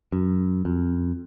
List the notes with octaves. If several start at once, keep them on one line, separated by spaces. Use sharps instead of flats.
F#2
F2